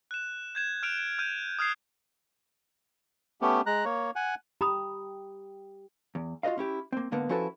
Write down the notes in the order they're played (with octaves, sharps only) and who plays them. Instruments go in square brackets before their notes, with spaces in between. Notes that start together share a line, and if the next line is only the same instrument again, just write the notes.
[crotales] F#6 E7
G6 G#6 E7
F6 F#6 D7 F7
D7
F6 G6 D#7
D#6 F6 G#6 C7
[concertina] A3 B3 C#4 G4
G#3 A#5 F#6
A#3 C#5
F#5 G#5
[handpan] G4 [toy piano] A#5 B5 D#6
[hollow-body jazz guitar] E2
F4 F#4 B4 D#5 F5
C#4 E4 G4
A#3 C4
G#2 D3 A#3 B3
F3 C#4 E4 F#4 A4 B4